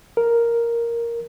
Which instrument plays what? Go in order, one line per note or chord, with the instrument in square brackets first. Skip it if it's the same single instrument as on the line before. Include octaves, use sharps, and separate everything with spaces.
[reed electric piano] A#4